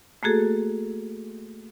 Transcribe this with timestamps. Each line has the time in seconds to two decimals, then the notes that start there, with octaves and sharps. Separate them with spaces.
0.23 A3 A#3 F#4 G#4 A4